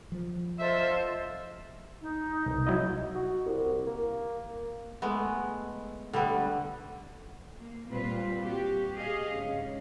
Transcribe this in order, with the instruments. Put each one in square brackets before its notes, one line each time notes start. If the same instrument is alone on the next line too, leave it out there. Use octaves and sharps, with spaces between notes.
[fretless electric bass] F3
[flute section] F4 A4 D#5 [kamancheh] C5 [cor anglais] E5
[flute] D#4
[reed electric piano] C2
F#3 E4 D#5
[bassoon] F#4
C2
A#3
[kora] G#3 A3 B3
D3 G3 A3 B3
[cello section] A#3
A#2 G3 C4 F4 B4
F#4 G4
G#4 D#5 F5
G#2 C#3 C#4